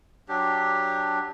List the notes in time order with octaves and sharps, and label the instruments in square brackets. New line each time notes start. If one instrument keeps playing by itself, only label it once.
[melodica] F#3 D4 G4